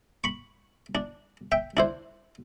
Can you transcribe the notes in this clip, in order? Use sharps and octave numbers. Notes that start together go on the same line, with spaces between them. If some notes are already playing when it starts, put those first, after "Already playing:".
B5 C#6
D4
E5 G5
D4 E4 C5